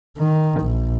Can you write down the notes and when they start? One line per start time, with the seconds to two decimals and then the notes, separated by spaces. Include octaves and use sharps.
0.18 D#3
0.61 A#1